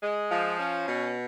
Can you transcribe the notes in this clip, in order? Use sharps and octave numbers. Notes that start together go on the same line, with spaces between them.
G#3
F3
C#4
B2